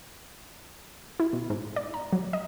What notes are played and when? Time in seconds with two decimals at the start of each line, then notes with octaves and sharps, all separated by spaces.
1.20 E4
1.33 B2
1.50 G#2
1.76 D5
1.94 A#5
2.13 F#3
2.33 D#5